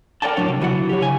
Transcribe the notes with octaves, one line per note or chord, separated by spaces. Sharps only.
A#4 C#5 D5 F#5 G5 A5
A2 F#3 D4 C#5 F#5
C3
C#2 E3 F#3 F5 F#5
G4 C#5
D2 C#3 G#5